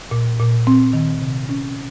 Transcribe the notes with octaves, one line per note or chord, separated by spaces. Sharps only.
A#2
A#2
C4
D#3
C3
C#4